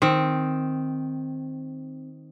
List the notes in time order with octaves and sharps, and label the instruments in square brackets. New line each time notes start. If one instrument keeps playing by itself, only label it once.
[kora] D#3 C4